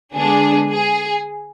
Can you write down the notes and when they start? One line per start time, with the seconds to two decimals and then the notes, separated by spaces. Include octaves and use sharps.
0.15 D3 G#3 B3 D4 G#4
0.70 G#4